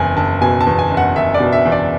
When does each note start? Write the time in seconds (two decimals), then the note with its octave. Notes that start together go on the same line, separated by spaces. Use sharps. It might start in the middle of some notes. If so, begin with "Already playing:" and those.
Already playing: F#1 E2 G#5
0.17 F#1 A5
0.41 B2 G#5
0.61 A5
0.67 E2
0.79 G#5
0.91 F#1
0.97 F#5
1.16 F#1 E5
1.34 D5
1.40 B2
1.52 E5
1.65 E2
1.72 D5